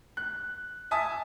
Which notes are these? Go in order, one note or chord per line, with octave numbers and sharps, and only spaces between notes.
F#6
E5 G#5 A5 D#6